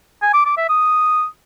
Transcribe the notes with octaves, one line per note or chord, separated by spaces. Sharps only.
G#5
D6
D6
E5
D#6